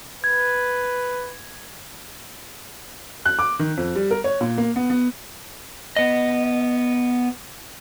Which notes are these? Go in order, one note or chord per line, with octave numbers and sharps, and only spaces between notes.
B4 G#6
F#6
D6
D#3
F2
G3
A#4
C#5
A#2
A#3
B3
B3
B3 D#5